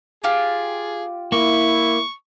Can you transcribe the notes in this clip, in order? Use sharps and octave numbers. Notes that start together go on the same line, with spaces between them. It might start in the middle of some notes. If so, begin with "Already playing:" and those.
F4 G4 G#4
A#3 E4 C#6